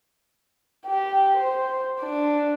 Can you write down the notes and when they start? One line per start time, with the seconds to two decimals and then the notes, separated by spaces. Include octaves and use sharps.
0.86 G4
1.37 C5
2.00 D4